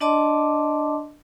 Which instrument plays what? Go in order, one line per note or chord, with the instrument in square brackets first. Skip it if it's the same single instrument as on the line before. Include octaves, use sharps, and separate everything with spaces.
[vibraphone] D4 D5 D#5 A5 C6 D6